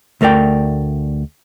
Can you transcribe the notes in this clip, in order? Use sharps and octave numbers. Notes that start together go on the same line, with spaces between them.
D2 A3 A#4 D5 G5